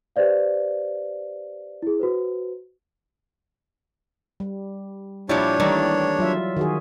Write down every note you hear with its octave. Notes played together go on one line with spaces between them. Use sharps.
G4 B4 C5 D5 F5
E4 G#4
F#4 B4 C5
G3
A#2 F3 G3 D4 E4 C#5
D#3 E3 G3 A3 A#3 D5
F#3 F4 E5
D#3 F#4 G#4